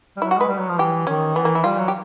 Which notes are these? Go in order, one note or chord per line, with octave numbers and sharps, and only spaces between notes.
G3
F#3 E4
F#4
G#3 B4
G3
F#3
F3
E3 G4
D#3 C#4
E3 B3
A#3
E4
G3 F4
F#3
G4